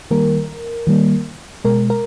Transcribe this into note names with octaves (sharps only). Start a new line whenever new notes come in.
D#3 G3 A#3 A#4
D#3 G3 A#3
B2 G#3 A#4
A#4